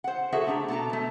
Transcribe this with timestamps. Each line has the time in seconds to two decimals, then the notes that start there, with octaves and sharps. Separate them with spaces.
0.04 C5 F#5
0.32 F#4 G#4 A4 E5 F#5
0.47 A3 D4 A#5
0.68 B2 A4 A5 A#5
0.90 B2 A3